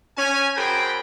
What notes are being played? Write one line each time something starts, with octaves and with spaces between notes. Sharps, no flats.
C#4 G#5
F#2 G#4 C5 G5 A#5 B5